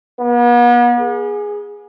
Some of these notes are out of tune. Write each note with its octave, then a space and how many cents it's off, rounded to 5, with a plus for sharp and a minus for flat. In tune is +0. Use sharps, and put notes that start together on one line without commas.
B3 -45
G#4 -5